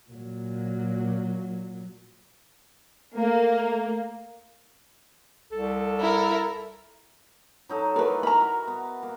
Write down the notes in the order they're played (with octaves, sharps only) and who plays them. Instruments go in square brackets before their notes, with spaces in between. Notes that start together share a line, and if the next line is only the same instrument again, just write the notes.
[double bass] A#2 F#3
[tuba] A3 [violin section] A#3
[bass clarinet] C2 [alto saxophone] A4
[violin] E4 A#4
[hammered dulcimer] F#3 D#4 A4
[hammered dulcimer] D#3 E3 A3 [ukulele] A#4 B4
[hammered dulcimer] A#4 E5 [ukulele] A#5 B5
[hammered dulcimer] F#4
B3
A#3